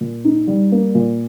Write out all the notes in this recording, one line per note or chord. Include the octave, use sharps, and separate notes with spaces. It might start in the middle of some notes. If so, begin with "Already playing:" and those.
A#2
D#4
G3
A#3
A#2